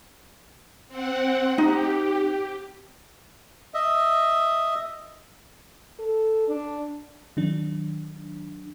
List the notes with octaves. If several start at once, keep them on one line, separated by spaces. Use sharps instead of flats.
C4 F#5
D#4 G4
D#5 E5
A4
D4
D#3 F#3 D4